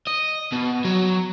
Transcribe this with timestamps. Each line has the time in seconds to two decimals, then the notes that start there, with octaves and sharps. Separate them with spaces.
0.07 D#5
0.52 B2
0.85 F#3